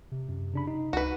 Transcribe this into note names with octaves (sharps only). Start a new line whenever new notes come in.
C3
F#2
C#3 D4 B5
D#4
C#2 F#4 B4